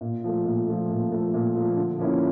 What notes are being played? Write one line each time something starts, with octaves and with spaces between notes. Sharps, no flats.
A#2
F3 A3
A#2
F3 A3
A#2
F3 A3
A#2
F3 A3
D3
F3 A#3 C#4 E4